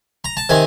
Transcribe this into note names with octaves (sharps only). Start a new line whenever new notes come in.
A#5
A5
C3 D#3 G#5